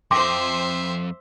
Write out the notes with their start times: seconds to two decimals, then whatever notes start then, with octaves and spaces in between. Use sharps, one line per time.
0.11 F2 C5 E5 G5 C6 D6 A#6